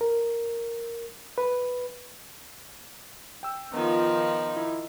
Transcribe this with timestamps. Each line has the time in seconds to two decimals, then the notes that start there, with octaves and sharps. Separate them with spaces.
0.01 A#4
1.38 B4
3.43 G5 E6
3.73 D#3 F3 B3 D#4 F4
4.56 E4